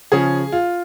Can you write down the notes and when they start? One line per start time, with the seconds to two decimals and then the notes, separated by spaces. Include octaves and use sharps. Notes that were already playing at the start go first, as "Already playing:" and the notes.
0.12 C#3 F3 C#4 G#4
0.52 F4